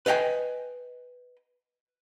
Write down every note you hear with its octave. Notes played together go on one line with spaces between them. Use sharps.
B4 D#5 F5 G5 G#5